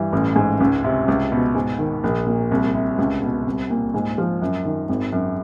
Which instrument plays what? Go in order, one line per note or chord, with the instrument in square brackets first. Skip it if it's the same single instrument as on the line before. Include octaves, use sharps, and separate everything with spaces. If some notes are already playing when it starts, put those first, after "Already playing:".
Already playing: [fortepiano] G2 E3
A1
G#2
C#2
C3
C#2
B2
G#2
D#3
A#1
A#2
C2
C3
C#2
B2
C2
A#2
G#2
F3
F#2
D#3
G#1
F#2